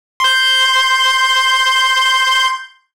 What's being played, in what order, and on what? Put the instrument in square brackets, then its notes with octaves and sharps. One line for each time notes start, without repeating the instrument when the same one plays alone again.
[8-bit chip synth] C6 G6